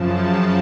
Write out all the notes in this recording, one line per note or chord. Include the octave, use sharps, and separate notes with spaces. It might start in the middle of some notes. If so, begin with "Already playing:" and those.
Already playing: F#2 C#3 F3 A5